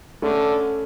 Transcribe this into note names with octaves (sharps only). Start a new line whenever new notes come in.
D3 A3 C#4